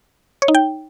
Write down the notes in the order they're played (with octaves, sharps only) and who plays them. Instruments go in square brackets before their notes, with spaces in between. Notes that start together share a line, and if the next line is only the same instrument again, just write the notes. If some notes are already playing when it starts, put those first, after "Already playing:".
[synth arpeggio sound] C#5
D#4
G5